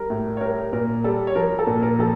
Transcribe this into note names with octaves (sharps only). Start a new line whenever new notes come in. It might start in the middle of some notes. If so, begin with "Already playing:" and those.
Already playing: G3 A#4
A2
C#5
G3 A#4
A#2 A#4
G3 A4
C#5
F3 A#4
A4
A#2
A#4
F3 A4